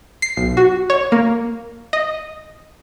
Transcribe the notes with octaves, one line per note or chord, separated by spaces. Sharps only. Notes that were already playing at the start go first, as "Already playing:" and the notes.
C7
B1
F#4
C#5
A#3
D#5